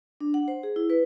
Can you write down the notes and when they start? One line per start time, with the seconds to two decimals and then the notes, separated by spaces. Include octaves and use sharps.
0.21 D4
0.34 F#5
0.48 C5
0.63 G#4
0.76 E4
0.90 B4